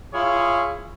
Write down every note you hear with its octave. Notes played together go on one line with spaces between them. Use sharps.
E4 F4 G#4 C#5 F5